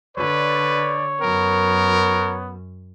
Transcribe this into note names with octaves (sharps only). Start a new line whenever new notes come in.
D3 B4 C#5 D5
F#2 B3 A#4